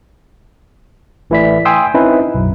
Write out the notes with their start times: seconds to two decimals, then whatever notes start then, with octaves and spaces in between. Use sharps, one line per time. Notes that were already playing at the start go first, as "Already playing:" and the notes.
1.30 A1 E3 A3 E4 D5 B6
1.65 G5 G#5 C6 D#6 E6
1.94 C4 C#4 D#4 E4 B4
2.34 B1 F#2